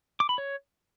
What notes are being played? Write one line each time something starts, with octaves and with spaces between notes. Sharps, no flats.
D6
B5
C#5